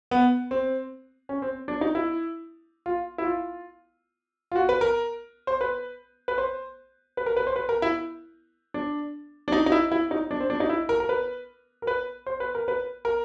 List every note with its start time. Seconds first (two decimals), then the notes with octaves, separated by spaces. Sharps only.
0.11 B3
0.51 C4
1.29 C#4
1.42 C4
1.68 D4
1.81 D#4
1.95 E4
2.86 F4
3.18 E4
3.25 F4
4.52 F4
4.56 F#4
4.69 B4
4.81 A#4
5.47 C5
5.61 B4
6.28 B4
6.38 C5
7.17 B4
7.26 A#4
7.37 B4
7.47 C5
7.56 B4
7.69 A#4
7.82 E4
8.74 D4
9.48 D4
9.52 D#4
9.66 D#4
9.72 E4
9.92 E4
10.11 D#4
10.31 D4
10.40 C4
10.50 D4
10.60 D#4
10.69 E4
10.89 A#4
11.00 A#4
11.09 B4
11.82 A#4
11.87 B4
12.27 C5
12.40 B4
12.55 A#4
12.68 B4
13.05 A#4